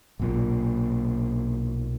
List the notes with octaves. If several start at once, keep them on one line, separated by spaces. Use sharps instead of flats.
B1 A#2 A#3